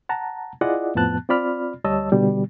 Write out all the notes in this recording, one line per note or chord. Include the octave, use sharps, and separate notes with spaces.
F#5 A5 A#5
E4 F4 G#4 D5 D#5 F#5
F2 A2 F3 B3 A5 F#6
C4 F4 D5 B5 F6
D2 G3 C#5 D#5 A5 E6
B2 D3 G3